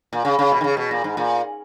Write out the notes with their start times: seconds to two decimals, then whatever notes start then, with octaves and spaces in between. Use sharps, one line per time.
0.13 A#2
0.25 C#3
0.39 C#3
0.52 B2
0.61 D#3
0.64 C#3
0.77 B2
0.91 A#2
1.04 G#2
1.17 A#2